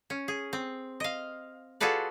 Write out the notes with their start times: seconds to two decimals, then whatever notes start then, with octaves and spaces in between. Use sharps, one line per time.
0.10 C#4
0.28 G#4
0.53 C4
1.00 D#5 F5
1.80 F4 F#4 G#4 A4 B4 D5